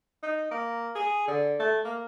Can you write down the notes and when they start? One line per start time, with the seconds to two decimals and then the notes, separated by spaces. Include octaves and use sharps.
0.23 D#4
0.51 A#3
0.95 G#4
1.28 D3
1.59 A3
1.85 A#3